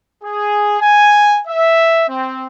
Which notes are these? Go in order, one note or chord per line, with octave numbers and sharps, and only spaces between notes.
G#4
G#5
E5
C4